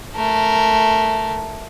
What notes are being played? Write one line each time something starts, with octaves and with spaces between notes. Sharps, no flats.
A3 A#4